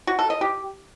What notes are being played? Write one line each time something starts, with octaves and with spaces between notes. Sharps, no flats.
F#4
A4
D#5
G4